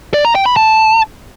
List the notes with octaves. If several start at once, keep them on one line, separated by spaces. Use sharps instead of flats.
D5
A#5
G5
B5
A5